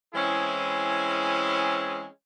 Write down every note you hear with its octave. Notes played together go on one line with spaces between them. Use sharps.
E3 G#3 C4 C#4 E4 G#4